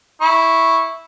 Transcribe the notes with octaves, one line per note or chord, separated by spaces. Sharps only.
E4 C#6